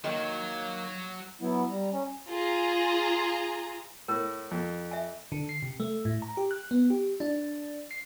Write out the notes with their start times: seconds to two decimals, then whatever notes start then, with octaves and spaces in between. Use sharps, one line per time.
0.04 D#3 F#3 A#3
1.41 F#3 B3 E4
1.69 G3 A#5
1.92 C#4
2.29 F4 G#4 A#5
4.08 A2 A#4
4.51 F2
4.91 E5 G#5
5.32 D3
5.49 C7
5.62 C3
5.80 A3
6.05 A2
6.22 A#5
6.37 G4
6.51 F#6
6.71 B3
6.90 G4
7.20 D4
7.91 C7